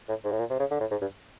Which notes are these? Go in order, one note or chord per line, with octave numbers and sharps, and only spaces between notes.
A2
G#2
A2
A#2
C3
C#3
D3
A2
G#2
G2